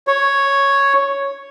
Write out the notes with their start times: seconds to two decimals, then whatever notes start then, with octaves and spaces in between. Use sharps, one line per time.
0.07 C#5